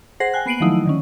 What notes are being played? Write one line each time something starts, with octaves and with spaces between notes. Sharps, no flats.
G#4 C5 F#5 A#6 C7
G5 G#5 F#6
A#3 B3 C7 D7 D#7 F#7
D#3 F3 F#3 A3 D#4 E4
D3 D#3 C#4